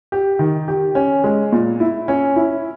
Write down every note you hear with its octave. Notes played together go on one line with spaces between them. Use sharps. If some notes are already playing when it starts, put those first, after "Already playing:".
G4
D#3
G4
C#4
G#3
A#2
E4
C#4
E4